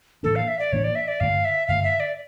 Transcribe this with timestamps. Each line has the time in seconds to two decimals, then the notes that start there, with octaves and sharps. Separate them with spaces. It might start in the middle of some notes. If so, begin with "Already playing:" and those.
0.23 A2 E3 A#3 D4 A4
0.36 F5
0.48 E5
0.59 D5
0.72 A2 E3 A#3 D4 C#5
0.84 D5
0.95 E5
1.08 D5
1.20 G2 D3 A3 F5
1.45 E5
1.68 G2 D3 A3 F5
1.84 E5
2.00 D5